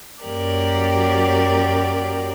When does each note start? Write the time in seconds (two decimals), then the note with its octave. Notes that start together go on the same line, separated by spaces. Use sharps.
0.22 F#2 F#3 A#3 G4 A#4 D5